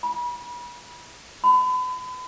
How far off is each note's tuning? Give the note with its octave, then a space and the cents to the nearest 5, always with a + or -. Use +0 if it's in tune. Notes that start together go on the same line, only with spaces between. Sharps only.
B5 -35
B5 +40